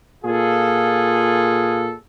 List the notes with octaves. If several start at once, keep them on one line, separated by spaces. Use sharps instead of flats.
A#2 F4 G#4 A4